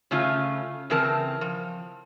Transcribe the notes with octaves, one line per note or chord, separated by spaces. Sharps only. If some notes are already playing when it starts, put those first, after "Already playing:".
C#3 A3 C#4 F4
C#3 E3 C4 A#4 A5
F3